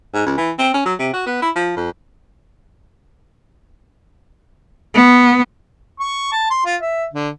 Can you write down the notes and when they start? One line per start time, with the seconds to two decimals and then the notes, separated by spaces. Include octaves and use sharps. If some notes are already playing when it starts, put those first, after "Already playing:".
0.14 G#2
0.26 C#2
0.37 E3
0.58 C4
0.74 C#4
0.86 F#3
0.99 C3
1.13 F#4
1.26 B3
1.42 E4
1.55 F3
1.76 F2
4.94 B3
6.00 C#6
6.32 A5
6.50 C6
6.65 F4
6.81 E5
7.13 D3